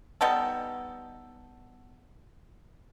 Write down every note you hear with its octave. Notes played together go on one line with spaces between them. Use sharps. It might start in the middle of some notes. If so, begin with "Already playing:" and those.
G3 B3 D#4 A4